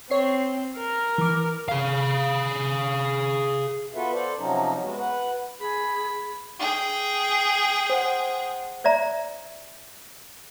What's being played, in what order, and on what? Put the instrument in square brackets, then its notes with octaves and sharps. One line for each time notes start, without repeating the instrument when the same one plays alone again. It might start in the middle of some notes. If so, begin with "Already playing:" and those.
[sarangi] C4 [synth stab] C#5 C7
[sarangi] A#4
[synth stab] E3 D6
[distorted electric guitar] G#4 F5
[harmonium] B3 F4 F#4 A4 B4 E5
A4 C5 D5
C3 F3 F#3 C#4 D#4
G#3 B3 F#4
B4 F#5
[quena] G#4 [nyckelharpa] B5
[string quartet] G#4 G5
[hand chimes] C5 F#5
[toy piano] C5 D5 E5 A#5